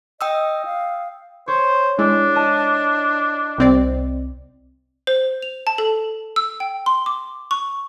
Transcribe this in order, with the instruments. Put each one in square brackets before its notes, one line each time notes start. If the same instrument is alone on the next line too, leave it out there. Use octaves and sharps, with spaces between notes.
[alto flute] D#5 [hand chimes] G5 D#6 E6
[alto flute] F5
[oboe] C5 [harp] C#5
[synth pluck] G#3 [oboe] D4 [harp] E4
[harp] D#5 A5
[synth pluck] C2 C4 D5
[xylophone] C5
F7
A5
A4
E6
G5
C6
D6
C#6